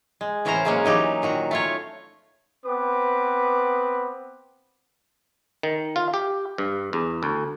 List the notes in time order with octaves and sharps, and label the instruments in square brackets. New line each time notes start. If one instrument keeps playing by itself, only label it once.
[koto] G#3
A2 E3 C#4 A#4 C5 A#5
C#3 F#3 G#3 A#3 C#4
E3 F#3 D#4 G4
A#2 D#3 F#4 A#5
A3 F4 C#5
[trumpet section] B3 C4 B4 D6
[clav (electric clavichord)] D#3
F4
G4
G2
E2
D2